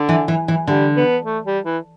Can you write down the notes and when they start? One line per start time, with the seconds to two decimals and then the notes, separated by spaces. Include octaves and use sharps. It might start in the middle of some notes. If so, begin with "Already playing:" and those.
Already playing: D3
0.09 E3
0.28 E3
0.48 E3
0.67 D3 G3
0.97 B3
1.25 A3
1.46 G3
1.65 E3